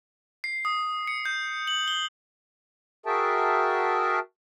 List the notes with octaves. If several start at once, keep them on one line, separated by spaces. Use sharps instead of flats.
C7
D#6
C#7
G6
F#7
G7
F#4 G#4 A#4 E5 G5 A5